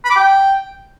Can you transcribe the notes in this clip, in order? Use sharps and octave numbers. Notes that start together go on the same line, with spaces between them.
B5
D6
G5